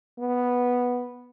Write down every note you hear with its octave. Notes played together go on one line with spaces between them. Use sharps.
B3